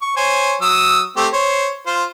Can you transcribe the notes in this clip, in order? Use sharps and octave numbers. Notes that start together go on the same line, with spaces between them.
C#6
C5 C#5 G#5
F#3 D#6 E6
A3 C4 G4
C5 C#5
F4 C5